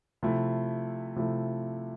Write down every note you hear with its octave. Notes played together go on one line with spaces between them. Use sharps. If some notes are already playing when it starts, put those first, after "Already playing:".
C3 F3 A3 E4
C3 F3 A3 E4